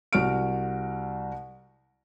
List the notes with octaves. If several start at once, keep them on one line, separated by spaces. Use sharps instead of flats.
C2 F#4 F6 D7